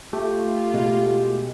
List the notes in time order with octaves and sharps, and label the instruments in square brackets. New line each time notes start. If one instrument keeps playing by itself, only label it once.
[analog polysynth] A3 [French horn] F4 [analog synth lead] G4
[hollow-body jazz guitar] B2 G#3